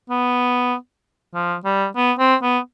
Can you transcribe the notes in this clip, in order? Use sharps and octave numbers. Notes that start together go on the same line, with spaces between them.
B3
F3
G3
B3
C4
B3